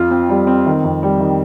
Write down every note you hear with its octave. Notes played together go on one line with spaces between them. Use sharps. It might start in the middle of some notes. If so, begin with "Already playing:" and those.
Already playing: F2 F4
C4
G3
C4
D#3
F2
G3
D#3